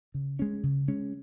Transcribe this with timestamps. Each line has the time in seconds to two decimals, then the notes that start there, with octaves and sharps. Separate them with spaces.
0.14 C#3
0.39 G#3 C#4
0.63 C#3
0.88 G#3 C#4